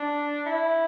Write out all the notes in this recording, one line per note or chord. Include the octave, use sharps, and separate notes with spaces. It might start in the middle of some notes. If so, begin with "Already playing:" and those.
Already playing: D4
E4